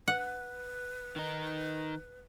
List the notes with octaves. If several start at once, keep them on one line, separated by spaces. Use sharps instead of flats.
B4 F#5
D#3 D#4